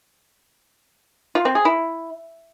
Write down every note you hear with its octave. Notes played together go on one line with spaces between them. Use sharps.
F4
C4
G#4
E4